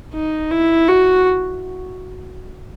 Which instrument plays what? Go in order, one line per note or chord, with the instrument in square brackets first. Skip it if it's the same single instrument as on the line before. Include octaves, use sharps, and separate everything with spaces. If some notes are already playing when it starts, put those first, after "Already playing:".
[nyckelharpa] D#4
E4
F#4